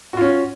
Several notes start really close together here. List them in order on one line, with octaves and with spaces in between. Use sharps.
F#4 F4 C#4